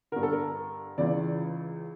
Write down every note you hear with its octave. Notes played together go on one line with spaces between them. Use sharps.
G2 D3 A#4
A4
A#4
C#2 C#3 E3 D5